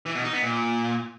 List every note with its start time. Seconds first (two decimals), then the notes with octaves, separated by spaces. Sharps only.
0.06 E3
0.15 B2
0.24 D#4
0.33 B3
0.42 A#2